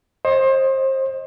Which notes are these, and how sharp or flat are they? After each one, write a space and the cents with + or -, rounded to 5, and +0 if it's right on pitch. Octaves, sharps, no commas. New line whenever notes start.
C5 +30 D#5 +0